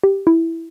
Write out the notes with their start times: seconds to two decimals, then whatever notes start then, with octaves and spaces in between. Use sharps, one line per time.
0.04 G4
0.27 E4